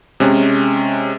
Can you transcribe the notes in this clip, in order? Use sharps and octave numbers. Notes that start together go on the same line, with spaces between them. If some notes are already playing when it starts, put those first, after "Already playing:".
C3 G#3 C#4